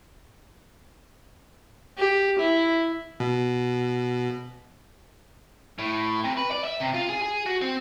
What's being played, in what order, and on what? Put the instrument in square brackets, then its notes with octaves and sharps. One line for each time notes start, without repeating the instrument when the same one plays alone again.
[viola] G4
E4
[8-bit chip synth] B2
[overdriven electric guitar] A2
C3
B4
D5
E5
C3
F4
G#4
G#4
F#4
C4